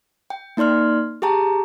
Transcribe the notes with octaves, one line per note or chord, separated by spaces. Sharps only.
G5
A#3 D#4 D5 C6 F6
G4 G#4 G5 A5 A#5